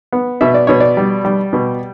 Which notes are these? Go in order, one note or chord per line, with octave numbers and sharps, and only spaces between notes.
B3
B2 E5
D5
B2 C#5
D5
G3
G3
B2